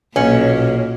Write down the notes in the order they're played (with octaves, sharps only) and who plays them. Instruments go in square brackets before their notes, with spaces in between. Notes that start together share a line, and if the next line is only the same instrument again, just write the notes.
[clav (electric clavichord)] B1 F#5 [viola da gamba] A#2 A#3 [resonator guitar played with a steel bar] C#4